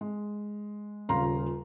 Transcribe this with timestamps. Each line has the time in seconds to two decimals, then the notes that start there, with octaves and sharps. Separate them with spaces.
0.01 G#3
1.09 D#1 C#3 F4 F5 A#5 C6